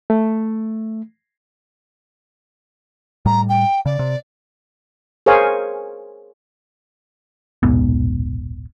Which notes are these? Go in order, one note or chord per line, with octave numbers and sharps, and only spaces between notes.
A3
A2 G3 A#5
G5
C#3 D5
C3
G#4 A#4 C5 C#5 F5 G#5
D#1 B1 G#2 B3